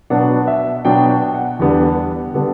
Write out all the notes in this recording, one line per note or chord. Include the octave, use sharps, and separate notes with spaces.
B2 F#3 B3 D4 F#5
E5
B2 F#3 B3 D4 G5
G5
F#5
E2 D3 G3 B3 D4
D3 G3 B3 D4